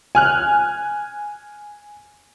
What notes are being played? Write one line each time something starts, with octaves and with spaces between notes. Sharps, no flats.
G#5 F6 F#6